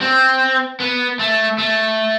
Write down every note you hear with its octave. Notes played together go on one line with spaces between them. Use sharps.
C4
B3
A3
A3